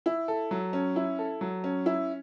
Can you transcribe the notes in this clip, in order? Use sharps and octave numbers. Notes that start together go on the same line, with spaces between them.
E4
A4
F#3
C#4
E4
A4
F#3
C#4
E4